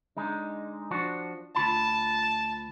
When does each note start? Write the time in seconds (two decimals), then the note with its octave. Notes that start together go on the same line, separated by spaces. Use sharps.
0.17 D3 G#3 D#4
0.91 F3 D4 F#4
1.56 D2 F4 A5 B5